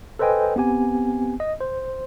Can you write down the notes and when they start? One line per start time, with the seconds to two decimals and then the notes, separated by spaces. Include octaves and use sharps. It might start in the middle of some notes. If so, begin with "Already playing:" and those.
0.19 A4 B4 C5 D#5 G5 G#5
0.56 B3 C4 G4 G#5
1.40 D#5
1.60 C5